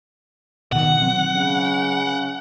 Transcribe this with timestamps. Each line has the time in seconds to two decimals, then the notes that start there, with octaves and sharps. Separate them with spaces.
0.72 B2 D#3 F#5
1.01 F#3 C4
1.36 C#3